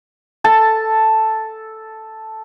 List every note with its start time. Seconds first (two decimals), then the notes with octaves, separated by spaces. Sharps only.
0.44 A4 A5